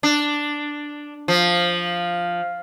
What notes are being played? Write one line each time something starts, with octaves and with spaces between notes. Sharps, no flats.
D4
F3